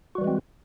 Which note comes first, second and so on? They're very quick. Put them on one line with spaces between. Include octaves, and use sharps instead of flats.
F#4 G3 E3 G#3 C4